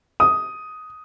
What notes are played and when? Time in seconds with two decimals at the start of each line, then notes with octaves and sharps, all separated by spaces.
0.20 D#6